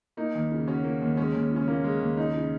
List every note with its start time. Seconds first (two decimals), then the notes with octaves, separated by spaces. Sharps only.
0.17 A#3 D#4
0.35 D#2
0.52 C#3
0.67 C#4 F#4
0.84 A#3
1.02 D#2
1.17 G#3 C#4
1.34 D#2
1.51 C#3
1.56 C#4
1.68 A#3 C#4
1.84 G#3
2.01 D#2
2.17 C#4 D#4
2.34 C#3